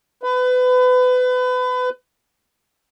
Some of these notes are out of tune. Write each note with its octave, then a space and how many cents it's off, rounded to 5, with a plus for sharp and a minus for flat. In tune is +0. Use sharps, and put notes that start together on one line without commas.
B4 +30